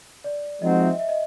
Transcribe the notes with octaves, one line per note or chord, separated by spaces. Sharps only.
D5
F3 G#3 C4 D#4 F#4 D#5
E5
E5
D#5